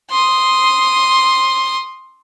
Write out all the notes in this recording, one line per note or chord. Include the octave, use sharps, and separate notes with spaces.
C6 D#6